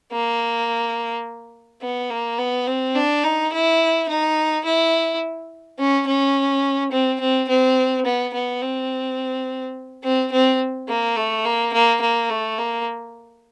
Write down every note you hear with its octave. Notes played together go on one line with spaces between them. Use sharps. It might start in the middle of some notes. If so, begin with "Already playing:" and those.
A#3
B3
A#3
B3
C4
D4
D#4
E4
D#4
E4
C#4
C#4
C4
C4
C4
B3
B3
C4
C4
C4
A#3
A3
A#3
A#3
A#3
A3
A#3